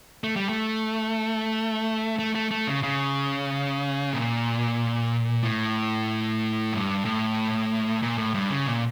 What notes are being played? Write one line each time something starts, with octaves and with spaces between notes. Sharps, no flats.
A3
G3
A3
A3
A3
A3
C#3
C#3
A#2
A2
G2
A2
A#2
A2
G2
C#3
A#2